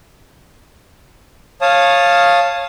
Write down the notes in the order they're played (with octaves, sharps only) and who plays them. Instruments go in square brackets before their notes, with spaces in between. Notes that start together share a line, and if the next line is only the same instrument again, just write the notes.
[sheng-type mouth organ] C#5 F5 A5 D#6